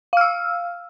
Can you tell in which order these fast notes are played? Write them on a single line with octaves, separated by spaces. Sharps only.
F5 F6 E6